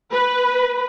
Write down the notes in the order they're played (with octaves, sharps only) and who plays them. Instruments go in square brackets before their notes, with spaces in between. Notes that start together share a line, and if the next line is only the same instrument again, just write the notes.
[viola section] B4